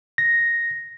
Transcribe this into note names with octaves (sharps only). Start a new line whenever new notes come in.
A#6